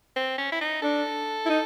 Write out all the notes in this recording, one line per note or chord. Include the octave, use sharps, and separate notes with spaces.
C4
C#4
E4
D#4
D4 A4
E4
D#4